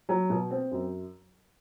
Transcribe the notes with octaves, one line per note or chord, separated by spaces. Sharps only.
F#3
B2
C4
F#2